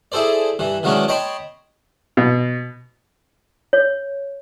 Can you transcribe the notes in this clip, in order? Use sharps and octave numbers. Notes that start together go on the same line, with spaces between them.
E4 G#4 A4 C5 D5
G2 E3
D#3 E3 F#3 G#3 C#4 D4
C#5 D#5 G5 A5 B5 C6
B2
C#5